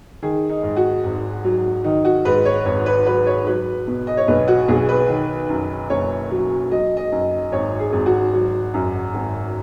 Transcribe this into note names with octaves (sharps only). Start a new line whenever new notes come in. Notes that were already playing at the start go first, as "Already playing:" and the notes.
D#3 G#4
D#4
G#2
F#4
G#1
F#3
D#3 D#4
F#4
G#2 B4
C#5
G#1 C#5
B4
F#3 B4
C#5
F#3 B4
B2
D#5
C#5
B1 B4
F#4
B1 G#4
B4
D#3
F#2
F#1 C#5
F#3
F#3 D#5
D#5
F#2
G#1 C#5
G#4
G#1
F#4
F#3
F#2
G#1